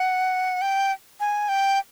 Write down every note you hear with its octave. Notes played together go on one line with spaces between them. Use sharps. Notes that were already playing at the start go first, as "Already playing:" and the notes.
Already playing: F#5
G5
G#5
G5